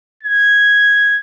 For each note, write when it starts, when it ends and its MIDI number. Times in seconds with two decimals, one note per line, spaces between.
0.23 1.18 92